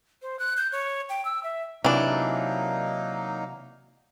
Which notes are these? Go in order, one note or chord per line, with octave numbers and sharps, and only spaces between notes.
C5
F#6
G6
C#5
G5
E6
E5
C3 E3 F#3 A#3 D4 D#4